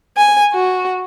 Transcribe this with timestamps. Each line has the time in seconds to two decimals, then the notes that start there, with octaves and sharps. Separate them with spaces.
0.17 G#5
0.53 F#4